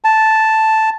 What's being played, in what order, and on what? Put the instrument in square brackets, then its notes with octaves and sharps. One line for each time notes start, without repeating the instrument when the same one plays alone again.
[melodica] A5